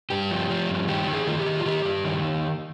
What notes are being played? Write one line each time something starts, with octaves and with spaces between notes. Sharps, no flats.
G2 G4
F3
F3
G2
D#3 G4
D#3
G#4
D#3 F4
G4
D#3
F4
D#3 G4
G2
D#3